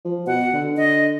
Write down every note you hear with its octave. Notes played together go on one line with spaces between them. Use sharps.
F3
B2 F#5
D3
D3 D#5